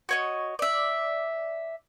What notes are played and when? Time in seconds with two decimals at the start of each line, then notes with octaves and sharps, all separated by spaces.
0.09 F#4 C#5 D#5
0.59 D5 E5